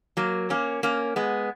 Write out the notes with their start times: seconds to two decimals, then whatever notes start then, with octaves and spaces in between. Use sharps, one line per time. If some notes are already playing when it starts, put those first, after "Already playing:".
0.17 F#3 A#3
0.50 A#3 C#4
0.83 A#3 C#4
1.16 G#3 B3